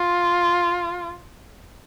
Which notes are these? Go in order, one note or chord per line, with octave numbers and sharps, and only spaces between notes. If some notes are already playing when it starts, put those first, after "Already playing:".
Already playing: F4